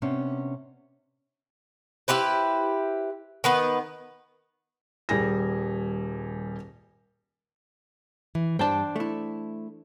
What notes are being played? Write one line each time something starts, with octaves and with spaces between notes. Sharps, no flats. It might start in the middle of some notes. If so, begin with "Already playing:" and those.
C3 B3 C#4 D4
E4 G4 B4 C5
D#3 B3 B4
D#1 G3 G#4 G#5 A#6
E3
G2 D4 C5 G5 A5
A3 E4